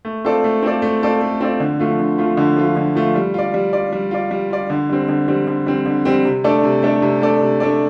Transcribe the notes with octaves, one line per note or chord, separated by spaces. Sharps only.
A3
C4 F4 A4 D5
A3
C4 F4 A4 D5
A3
C4 F4 A4 D5
A3
C4 F4 A4 D5
D3
F3 A3 F4
D3
F3 A3 F4
D3
F3 A3 F4
D3
F3 A3 F4
G3
F4 D5
G3
F4 D5
G3
F4 D5
G3
F4 D5
D3
G3 C4
D3
G3 C4
D3
G3 C4
D3
G3 C4
C3
A3 D4 A4 D5
C3
A3 D4 A4 D5
C3
A3 D4 A4 D5
C3
A3 D4 A4 D5